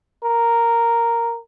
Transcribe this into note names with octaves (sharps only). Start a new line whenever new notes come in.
A#4